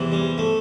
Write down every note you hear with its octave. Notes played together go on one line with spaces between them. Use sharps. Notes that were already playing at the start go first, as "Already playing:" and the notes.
Already playing: E2 C3 E3
G3
A3